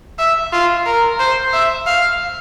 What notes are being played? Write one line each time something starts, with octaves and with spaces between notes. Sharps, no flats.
E5
F4
A#4
C5
E5
F5